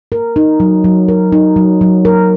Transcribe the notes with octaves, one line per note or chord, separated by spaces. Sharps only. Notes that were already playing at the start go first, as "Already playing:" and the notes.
A#4
D#4
F#3
F#3
A#4
D#4
F#3
F#3
A#4